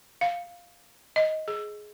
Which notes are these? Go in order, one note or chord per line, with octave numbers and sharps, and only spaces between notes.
F5
D#5
G#4